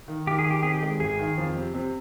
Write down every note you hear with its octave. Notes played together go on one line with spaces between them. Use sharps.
D#3
D#3 G4
G#4
D#3
G4
C3 G#4
G4
G#3
G#1 G#4
D#3
F2
C3
C3